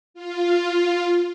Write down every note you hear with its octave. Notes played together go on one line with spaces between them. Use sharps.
F4